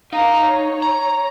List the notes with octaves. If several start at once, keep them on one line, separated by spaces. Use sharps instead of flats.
D#4 F5 A#5
C#5
A#5